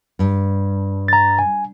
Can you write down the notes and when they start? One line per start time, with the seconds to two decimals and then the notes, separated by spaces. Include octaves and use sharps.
0.19 G2
1.08 A#5 A6
1.39 G#5